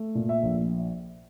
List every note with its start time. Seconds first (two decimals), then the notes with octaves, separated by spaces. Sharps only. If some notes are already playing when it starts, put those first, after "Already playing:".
Already playing: A3
0.15 A#2
0.29 E5
0.43 A#1